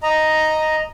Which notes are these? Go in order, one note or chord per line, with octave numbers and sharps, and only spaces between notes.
D#5 A#5